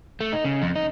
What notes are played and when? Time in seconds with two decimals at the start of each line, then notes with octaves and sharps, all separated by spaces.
0.21 A3
0.33 D#4
0.45 C#3
0.62 F2
0.75 D#4